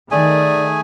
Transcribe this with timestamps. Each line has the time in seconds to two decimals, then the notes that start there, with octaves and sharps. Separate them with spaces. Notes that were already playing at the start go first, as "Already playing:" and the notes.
0.11 D#3 A3 G#4 D5 G#5